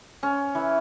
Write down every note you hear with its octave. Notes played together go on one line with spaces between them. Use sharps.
C#4
E3